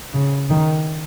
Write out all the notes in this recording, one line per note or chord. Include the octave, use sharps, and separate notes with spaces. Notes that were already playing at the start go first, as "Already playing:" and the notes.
C#3
D#3